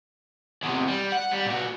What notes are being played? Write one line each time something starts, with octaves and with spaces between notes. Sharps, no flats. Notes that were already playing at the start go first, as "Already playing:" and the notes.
E2 C3
G3
F#5
G3
A#2 F#4